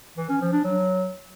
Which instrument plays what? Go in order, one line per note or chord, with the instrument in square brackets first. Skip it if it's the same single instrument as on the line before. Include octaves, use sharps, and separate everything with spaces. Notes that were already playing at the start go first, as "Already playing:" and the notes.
[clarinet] E3
C#4
F3
D4
F#3